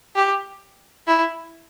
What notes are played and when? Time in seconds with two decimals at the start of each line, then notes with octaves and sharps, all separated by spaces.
0.16 G4
1.07 E4